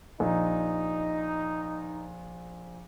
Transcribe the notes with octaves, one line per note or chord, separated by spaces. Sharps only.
A#1 D#4